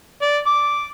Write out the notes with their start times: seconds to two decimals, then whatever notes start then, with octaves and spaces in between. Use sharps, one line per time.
0.22 D5
0.47 D6